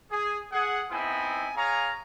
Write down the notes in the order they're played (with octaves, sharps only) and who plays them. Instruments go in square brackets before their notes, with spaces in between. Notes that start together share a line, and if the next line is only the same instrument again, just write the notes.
[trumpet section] G#4
G#4 F#5
B3 C4 D#4 E4 G5 G#5
G#4 C#5 F5 G#5 A#5